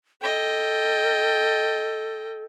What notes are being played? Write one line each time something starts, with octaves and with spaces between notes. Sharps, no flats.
A4 D#5 G5